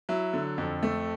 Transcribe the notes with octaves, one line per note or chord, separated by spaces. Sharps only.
F#3 E4
D3
F2
A3